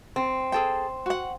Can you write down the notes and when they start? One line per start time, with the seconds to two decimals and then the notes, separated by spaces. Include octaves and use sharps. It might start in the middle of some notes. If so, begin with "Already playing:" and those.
0.16 C4
0.52 G#4 A4 G5
1.06 F#4 F#5